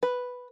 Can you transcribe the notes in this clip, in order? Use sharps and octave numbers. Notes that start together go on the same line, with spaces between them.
B4